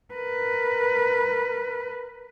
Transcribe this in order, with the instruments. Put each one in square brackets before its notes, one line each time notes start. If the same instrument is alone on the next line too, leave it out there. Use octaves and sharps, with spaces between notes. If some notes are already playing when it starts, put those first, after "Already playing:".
[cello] A#4 B4